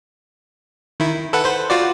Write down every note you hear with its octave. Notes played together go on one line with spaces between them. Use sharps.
D#3 E4
A4 B4 F#5
B4 C5
F4 F#4 D5